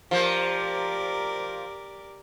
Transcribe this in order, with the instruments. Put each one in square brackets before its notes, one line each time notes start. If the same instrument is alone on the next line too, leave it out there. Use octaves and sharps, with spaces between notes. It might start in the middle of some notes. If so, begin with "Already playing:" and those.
[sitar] F3 A#3 [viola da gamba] G4 A#4 D5